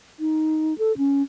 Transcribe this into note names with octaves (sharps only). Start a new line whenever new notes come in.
D#4
A4
C#4